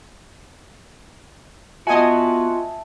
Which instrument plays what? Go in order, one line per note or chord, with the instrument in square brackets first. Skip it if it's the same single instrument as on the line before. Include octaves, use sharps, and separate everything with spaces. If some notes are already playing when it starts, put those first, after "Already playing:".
[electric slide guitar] B3 F#4 [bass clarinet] F4 [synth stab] D#5 G#5 [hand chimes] E5 A5